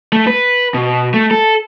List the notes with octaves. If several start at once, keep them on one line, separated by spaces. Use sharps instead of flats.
A3
B4
B2
A3
A4